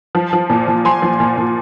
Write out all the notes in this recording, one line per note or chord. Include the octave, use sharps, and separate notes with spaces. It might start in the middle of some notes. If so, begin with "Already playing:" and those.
F3
F3
A#2
A#2
F3 G#5 C6
F3
A#2
A#2